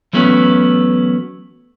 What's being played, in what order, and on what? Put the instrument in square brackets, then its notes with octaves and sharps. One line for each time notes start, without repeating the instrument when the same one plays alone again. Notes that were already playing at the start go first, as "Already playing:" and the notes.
[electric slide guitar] E3 F#3 A3 B3 C#4